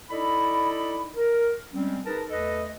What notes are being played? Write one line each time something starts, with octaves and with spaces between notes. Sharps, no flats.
D#4 E4 A4 D5 D#5 B5
A#4
G3 G#3 C4 C#4
D#4 G#4 A#4 B4 A5
E2 A3 A4 B4 D#5